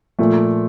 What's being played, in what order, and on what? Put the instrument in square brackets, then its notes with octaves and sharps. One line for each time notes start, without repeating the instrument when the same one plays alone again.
[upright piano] A#2 F3 A3